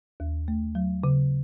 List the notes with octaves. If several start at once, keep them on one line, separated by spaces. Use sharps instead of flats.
D#2
A3
F#3
C#3